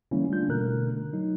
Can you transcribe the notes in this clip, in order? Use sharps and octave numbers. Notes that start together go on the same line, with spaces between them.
D3 E3 G3 A#3 C#4 E4
G3 A3 D4 F4 G6
B2 D3 A3 A#4 F#6
F#3 D#4